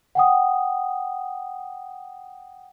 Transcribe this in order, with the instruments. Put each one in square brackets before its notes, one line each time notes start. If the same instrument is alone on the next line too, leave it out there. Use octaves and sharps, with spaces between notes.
[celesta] F#5 G5 D#6